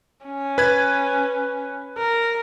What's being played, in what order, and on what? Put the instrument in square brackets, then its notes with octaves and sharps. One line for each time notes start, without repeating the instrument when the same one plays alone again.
[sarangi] C#4
[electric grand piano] B4 G#6
[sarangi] A#4